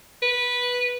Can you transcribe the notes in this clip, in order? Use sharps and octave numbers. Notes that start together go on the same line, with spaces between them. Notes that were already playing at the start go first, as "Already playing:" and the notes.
B4